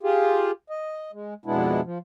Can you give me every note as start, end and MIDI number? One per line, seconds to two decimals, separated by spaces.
0.03 0.51 65
0.03 0.51 67
0.03 0.51 68
0.70 1.11 75
1.13 1.34 56
1.46 1.81 41
1.46 1.81 47
1.46 1.81 56
1.46 1.81 59
1.46 1.81 62
1.46 1.81 64
1.84 1.98 53